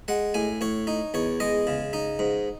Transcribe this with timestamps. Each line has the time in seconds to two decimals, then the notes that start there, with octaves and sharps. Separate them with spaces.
0.08 G#3 F#5
0.34 A2 G#5
0.61 A2 C#5
0.87 D#4
1.14 E2 C#5
1.40 G#3 D#5
1.67 C#3
1.93 D#4
2.19 G#2